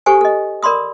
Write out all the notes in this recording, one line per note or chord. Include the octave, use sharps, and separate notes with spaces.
G4 A4 C5 G#5 C#6
A4 D#5
A#4 D5 B5 C6 D#6